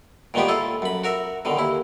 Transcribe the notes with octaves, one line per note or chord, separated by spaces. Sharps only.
A#2 D#3 G#3 B3 G4
E4 F4 A4
F#2 B5
F#4 A#4 E5
B2 D3 D#3
D#2 E4